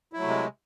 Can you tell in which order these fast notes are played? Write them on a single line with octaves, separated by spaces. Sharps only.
E4 F#3 A3 C3 G#3